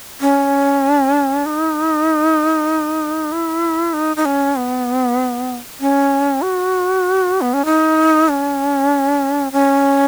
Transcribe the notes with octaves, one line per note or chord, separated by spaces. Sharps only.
C#4
D#4
E4
D#4
D#4
C#4
B3
C#4
F#4
B3
C#4
D#4
C#4
C#4